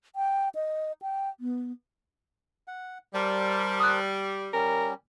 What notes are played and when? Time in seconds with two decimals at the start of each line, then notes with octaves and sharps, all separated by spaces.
0.16 G5
0.55 D#5
1.02 G5
1.40 B3
2.68 F#5
3.15 G3 A#4 C5 A5
3.80 D#6 F#6
4.53 G3 C#4 A#4